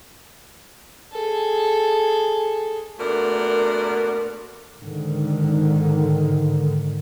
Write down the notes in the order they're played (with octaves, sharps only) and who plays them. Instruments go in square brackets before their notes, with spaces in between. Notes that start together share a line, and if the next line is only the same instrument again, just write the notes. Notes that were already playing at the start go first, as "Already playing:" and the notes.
[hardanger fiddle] G#4 A4
[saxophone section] A#2 A3 B3 D4 F#4 A#4
[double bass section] G#2 D3 D#3